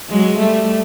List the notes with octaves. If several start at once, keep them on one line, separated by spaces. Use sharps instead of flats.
F#3 G#3
G3 A3